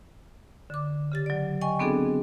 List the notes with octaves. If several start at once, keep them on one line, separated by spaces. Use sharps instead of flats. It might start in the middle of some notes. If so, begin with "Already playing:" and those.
D3 D6
C#3 G4 A6
F#3 D5
D#5 G5 G#5 C#6
B3 C4 D4 F#4 G#4 A4